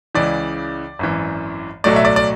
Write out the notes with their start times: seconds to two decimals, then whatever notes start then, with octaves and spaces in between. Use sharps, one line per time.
0.15 C#2 C#3 E3 D5
0.99 G#1 F#2 E3
1.84 B1 A2 F#3 A3 D5
1.96 E5
2.05 D5
2.16 D5